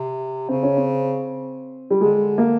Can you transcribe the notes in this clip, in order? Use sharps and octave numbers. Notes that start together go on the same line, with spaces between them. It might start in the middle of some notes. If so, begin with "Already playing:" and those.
Already playing: C3
C#3 C4
C#4
C4
G3
D3 G#3
A#3